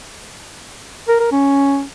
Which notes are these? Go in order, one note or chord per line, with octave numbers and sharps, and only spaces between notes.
A#4
A#4
C#4